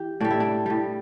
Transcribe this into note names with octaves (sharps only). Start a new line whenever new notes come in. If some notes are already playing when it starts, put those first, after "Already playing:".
Already playing: E3 G4
A2 G3 D4
E4
D4
A2 G3